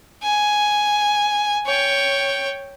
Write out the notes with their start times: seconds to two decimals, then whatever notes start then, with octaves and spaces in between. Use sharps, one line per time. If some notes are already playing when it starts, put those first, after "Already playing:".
0.22 G#5
1.66 C#5 G5